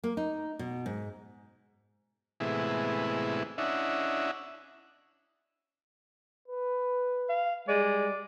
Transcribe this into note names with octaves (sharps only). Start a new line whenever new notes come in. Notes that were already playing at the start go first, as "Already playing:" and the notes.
A#3
D#4
B2
G#2
A2 C3 E3 G#3 B3 E4
C#4 D4 E4 D#5 E5 F#5
B4
F5
G3 G#3 D5